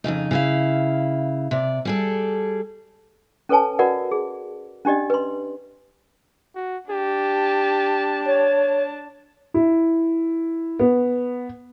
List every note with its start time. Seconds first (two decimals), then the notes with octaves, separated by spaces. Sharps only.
0.04 F2 A#2 C#3 D#4
0.31 C#3 E4 F5
1.51 C3 D5
1.85 G3 G#4 A4
3.49 C#4 A4 B4 C#5 G#5 A5
3.79 F#4 A#4 B4 D5 F#5
4.11 G#4
4.85 C#4 D4 G4 D5 D#5
5.10 B4 C6
6.55 F#4
6.90 D4 G4 A5
8.26 C#5
9.54 E4
10.80 B3